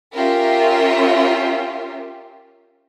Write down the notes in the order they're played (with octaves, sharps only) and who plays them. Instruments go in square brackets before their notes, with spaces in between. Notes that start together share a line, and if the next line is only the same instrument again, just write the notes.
[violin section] C#4 F4 G4 A#4 E5